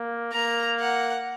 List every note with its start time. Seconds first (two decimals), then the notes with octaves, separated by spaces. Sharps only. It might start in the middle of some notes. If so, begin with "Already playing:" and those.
Already playing: A#3
0.33 A#3 A#5
0.80 F#5